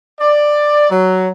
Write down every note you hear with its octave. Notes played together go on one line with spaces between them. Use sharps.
D5
F#3